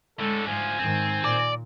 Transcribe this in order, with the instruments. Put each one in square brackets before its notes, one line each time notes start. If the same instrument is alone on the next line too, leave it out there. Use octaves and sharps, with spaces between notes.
[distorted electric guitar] A2 D3 [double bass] G#3 [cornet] A4
[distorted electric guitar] D2 F3 [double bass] G#2 [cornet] G#5
[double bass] G#2 D#3 [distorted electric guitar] C4
[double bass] A#2 [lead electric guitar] D5